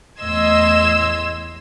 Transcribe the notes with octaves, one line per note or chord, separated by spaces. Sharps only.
E2 A2 D#5 C6 E6 G#6